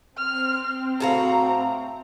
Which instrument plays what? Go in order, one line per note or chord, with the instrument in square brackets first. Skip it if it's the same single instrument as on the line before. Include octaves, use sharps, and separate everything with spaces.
[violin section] C4 [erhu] F6
[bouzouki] A2 F#4 F5 [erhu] A#5